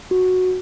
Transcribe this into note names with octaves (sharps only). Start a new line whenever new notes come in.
F#4